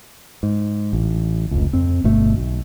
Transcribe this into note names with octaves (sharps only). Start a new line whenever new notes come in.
G#2
A1
F1 C#2
F2 C4
G1 B2 A3
B1